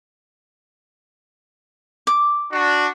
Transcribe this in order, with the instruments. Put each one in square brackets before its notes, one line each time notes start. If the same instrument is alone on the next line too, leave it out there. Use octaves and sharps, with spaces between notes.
[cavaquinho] D6
[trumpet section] D4 F#4